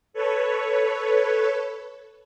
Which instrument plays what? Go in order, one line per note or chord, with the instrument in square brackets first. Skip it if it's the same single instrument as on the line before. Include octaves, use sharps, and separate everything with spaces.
[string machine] A4 B4 C#5